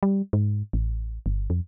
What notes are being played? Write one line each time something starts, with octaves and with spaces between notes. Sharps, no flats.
G3
G#2
A1
G1
F2